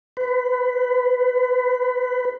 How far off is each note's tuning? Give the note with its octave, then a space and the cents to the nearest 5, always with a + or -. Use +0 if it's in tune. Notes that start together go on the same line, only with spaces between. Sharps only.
B4 +25